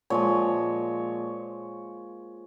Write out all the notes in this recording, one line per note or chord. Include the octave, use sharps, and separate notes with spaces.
A#2 F3 G#3 C#5